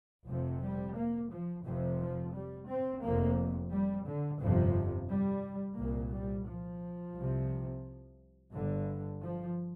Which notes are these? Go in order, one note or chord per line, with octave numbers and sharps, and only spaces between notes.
F1 F2 C3 F3
G3
A#3
F3
F1 F2 C3
F3
G3
C4
F1 F2 C3 A#3
G3
D3
G1 F2 C3 F3
G3
C2 A#2 A#3
G3
F3
C2 C3
G1 G2 D3
F3